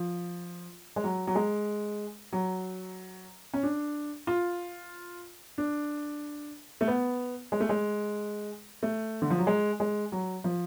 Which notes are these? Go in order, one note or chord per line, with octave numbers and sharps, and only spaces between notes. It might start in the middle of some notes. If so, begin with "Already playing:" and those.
Already playing: F3
G#3
F#3
F#3
G#3
F#3
C#4
D4
F4
D4
A3
B3
G#3
A3
G#3
A3
D3
F3
F#3
G#3
G#3
F#3
F3